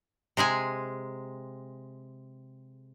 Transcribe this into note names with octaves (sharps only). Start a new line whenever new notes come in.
C3 G#3 G#4 G#5